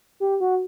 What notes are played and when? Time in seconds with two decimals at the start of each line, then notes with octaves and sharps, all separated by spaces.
0.20 G4
0.40 F#4